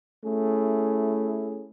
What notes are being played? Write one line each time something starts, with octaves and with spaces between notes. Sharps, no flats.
A3 C#4 E4 G#4